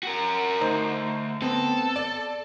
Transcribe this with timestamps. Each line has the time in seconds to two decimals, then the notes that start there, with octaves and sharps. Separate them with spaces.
0.03 F#4 A#4
0.61 D2 D#4 C5 A#5
1.42 B3 C4 A4
1.96 D5